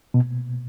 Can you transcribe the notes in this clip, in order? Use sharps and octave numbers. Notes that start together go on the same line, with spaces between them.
B2